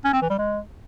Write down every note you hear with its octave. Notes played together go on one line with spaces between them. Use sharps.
C#4
C4
E3
G3
G#3